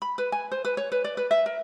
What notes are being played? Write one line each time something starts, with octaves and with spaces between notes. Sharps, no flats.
B5
B4
G#5
C5
B4
C#5
B4
D5
B4
E5
A#4